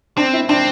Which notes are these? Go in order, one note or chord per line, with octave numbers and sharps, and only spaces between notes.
C4 D4
E4
C4 D4